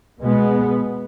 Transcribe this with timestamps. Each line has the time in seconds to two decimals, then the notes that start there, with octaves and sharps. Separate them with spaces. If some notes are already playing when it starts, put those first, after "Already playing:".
0.19 B2 G#3 B3